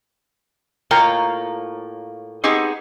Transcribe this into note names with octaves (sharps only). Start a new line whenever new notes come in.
A2 A#3 F4 C#5 G5 A#5
B3 C4 D#4 G4 G#4